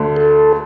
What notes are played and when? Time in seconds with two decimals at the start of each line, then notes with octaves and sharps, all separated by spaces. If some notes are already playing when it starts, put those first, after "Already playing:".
Already playing: D2 D3 A3
0.16 A4